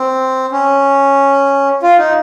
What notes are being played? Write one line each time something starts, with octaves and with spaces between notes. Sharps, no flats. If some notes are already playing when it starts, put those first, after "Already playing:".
Already playing: C4
C#4
F4
D#4